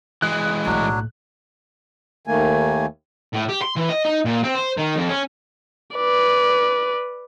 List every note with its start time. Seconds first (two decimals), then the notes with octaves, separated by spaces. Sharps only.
0.22 E3 G#3 F#6
0.65 B1 A2 F#3 D4
2.27 D#2 D#3 A3 A#3 G#5
3.33 A2
3.49 G4
3.62 C6
3.76 E3
3.89 D#5
4.05 D#4
4.25 A#2
4.44 C4
4.55 C5
4.78 D#3
4.96 F2
5.09 C#4
5.96 B4 D5